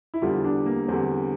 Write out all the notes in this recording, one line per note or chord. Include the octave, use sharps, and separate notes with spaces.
E4
E2 D3 G3 F4
D4
A#3
E2 D3 G3 C4